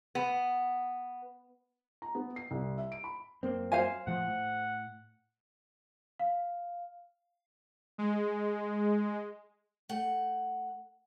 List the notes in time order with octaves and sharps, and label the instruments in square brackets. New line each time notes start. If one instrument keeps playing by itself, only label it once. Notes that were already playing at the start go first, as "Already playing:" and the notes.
[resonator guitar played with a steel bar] B3
[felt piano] A#5
B3
C7
C2
E5
D7
B5
[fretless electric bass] F#2 A#3 C4
[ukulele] C5 F5 G#5
[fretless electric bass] A2 F3 [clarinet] F#5
[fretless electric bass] A2
[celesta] F5
[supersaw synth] G#3
[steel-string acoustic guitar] A3 F#5